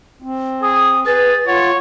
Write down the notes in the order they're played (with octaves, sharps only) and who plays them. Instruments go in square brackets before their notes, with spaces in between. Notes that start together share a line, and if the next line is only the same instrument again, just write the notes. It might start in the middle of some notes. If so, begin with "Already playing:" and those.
[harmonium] C4
[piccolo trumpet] G#4 [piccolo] D#6
[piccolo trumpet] G#4 [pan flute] B4 [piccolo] A6
[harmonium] F4 [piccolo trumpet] C#5 [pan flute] F#5